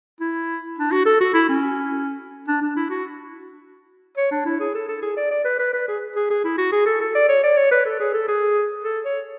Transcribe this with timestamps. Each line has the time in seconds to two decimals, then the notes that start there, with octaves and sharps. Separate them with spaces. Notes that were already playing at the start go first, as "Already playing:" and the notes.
0.21 E4
0.78 D4
0.92 F#4
1.06 A4
1.20 F#4
1.34 E4
1.49 C#4
2.48 D4
2.61 D4
2.76 E4
2.90 F#4
4.17 C#5
4.32 D4
4.46 E4
4.60 G#4
4.74 A4
4.88 A4
5.02 G#4
5.17 D5
5.31 D5
5.44 B4
5.59 B4
5.73 B4
5.88 G#4
6.16 G#4
6.30 G#4
6.44 E4
6.58 F#4
6.72 G#4
6.86 A4
7.01 A4
7.15 D5
7.29 C#5
7.43 D5
7.57 C#5
7.71 B4
7.85 A4
8.00 G#4
8.14 A4
8.28 G#4
8.84 A4
9.05 C#5